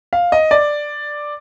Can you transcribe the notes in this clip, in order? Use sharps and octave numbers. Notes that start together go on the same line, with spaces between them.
F5
D#5
D5